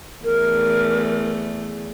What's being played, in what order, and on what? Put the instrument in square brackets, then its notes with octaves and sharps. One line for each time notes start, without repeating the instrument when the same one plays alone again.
[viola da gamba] E2 A3 [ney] A#4